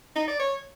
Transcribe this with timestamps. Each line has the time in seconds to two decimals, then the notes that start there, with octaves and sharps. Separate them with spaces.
0.16 D#4
0.28 D5
0.40 C#5